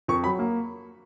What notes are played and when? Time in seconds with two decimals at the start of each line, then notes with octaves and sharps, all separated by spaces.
0.08 F2 C#6
0.24 F#3 B5
0.39 A#3